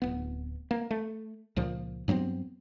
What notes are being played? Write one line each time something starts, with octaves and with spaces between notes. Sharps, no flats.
D1 B3
A#3
A3
C#2 A#2 F3
G2 F#3 B3 C4